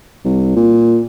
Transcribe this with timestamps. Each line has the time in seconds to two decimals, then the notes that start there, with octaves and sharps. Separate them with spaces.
0.25 C2
0.56 A#2